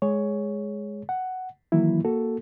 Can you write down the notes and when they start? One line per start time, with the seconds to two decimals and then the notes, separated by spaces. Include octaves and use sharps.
0.02 G#3 G#4 C#5
1.09 F#5
1.72 D#3 E3 F#3 A#3 E4
2.05 A#3 F#4 A4